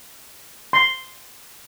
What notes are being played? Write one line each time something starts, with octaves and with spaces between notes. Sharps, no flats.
C6